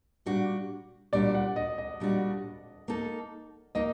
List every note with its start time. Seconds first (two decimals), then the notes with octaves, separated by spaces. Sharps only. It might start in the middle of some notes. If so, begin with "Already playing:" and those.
0.26 A#2 G3 D4 F#4
1.13 A#2 G3 D4 F#4 D5
1.35 F#5
1.56 D#5
1.78 D#5
2.00 A#2 G3 D4 F#4
2.88 A#3 D#4 A4
3.75 A#3 D#4 D#5